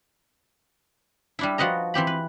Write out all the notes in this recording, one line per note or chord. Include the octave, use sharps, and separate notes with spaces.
G3 D4 E4
F3 F#4 B4 D#5 A#5
E3 C4 G4 B5
B4